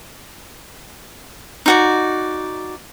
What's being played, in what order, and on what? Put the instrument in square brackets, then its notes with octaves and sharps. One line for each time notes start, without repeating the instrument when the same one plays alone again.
[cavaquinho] D#4 F#4 D5